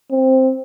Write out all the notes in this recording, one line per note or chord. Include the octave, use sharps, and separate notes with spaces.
C4